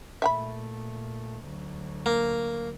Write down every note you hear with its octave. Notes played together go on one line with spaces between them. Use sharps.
A#2 A3 E5 G5 B5
D2 F#3
A#3